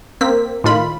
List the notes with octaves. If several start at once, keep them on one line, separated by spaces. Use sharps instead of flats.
A#3 C4 B6
A2 D#3 F4 B5